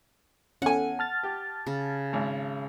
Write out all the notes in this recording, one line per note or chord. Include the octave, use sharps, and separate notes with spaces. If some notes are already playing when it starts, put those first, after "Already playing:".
E2 C#4 A4 F#5 G#5
A5 F6 A6
G4
C#3
G#1